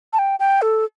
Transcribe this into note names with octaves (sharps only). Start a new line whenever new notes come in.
A5
G5
G5
A4